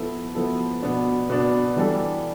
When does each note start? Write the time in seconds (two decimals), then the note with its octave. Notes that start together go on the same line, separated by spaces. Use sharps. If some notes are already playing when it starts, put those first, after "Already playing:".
Already playing: F3 B3 E4 A4
0.35 F3 B3 E4 A4
0.82 B2 B3 D4
1.30 B2 B3 D4
1.76 E3 G3 D4 A4